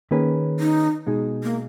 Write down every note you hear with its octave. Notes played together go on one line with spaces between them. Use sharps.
D#3 A#3 C#4 G#4 B4
D#4
B2 G#3 D#4 G#4
A#3